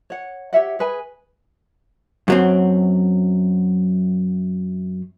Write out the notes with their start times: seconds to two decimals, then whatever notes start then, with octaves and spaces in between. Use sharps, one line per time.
0.10 C#5 F#5
0.53 G4 C#5 E5 F#5
0.79 G#4 B4 G#5
2.28 F#2 F#3 C4